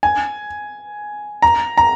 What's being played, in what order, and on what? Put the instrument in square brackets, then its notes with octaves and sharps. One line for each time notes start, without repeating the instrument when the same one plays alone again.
[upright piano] G#5
A#5
A#5